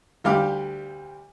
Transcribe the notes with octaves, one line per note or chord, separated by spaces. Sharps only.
D2 G3 F5 D6